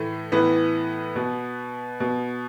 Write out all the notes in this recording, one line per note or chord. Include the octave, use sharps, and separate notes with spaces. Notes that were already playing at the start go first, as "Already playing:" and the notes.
Already playing: A2 E3 A3
A2 E3 B3
B2
B2